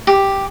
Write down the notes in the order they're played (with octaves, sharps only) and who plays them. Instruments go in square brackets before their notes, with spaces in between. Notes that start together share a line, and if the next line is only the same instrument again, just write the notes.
[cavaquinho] G4